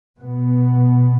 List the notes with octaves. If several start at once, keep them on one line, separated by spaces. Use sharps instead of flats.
B2 B3